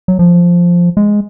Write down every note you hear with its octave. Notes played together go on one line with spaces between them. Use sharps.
F#3
F3
G#3